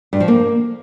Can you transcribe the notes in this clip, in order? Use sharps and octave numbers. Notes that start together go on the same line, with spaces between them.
G2
F3
A#3